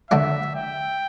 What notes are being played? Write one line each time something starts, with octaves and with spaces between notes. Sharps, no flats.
D3 F#3 A3 D4 F#4 E5
G5